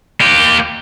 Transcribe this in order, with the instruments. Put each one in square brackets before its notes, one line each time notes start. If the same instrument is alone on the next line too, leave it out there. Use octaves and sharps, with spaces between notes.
[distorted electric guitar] A#3 G4